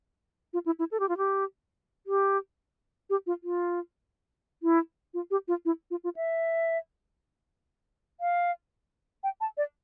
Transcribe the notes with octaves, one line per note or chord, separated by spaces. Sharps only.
F4
E4
E4
A4
G4
F4
G4
G4
G4
F4
F4
E4
F4
G4
F4
E4
F4
F4
E5
F5
G5
A5
D5